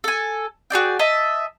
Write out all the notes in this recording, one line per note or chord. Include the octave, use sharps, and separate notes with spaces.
A4 G#5
F#4 G#4 D5 G5
D#5 E5 A5